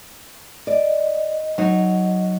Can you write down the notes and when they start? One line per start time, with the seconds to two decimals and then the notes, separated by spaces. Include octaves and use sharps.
0.67 D5 D#5
1.58 F#3 D#4